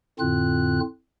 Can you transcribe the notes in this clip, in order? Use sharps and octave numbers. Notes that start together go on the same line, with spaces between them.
F2 A2 D3 C4 F4 F#6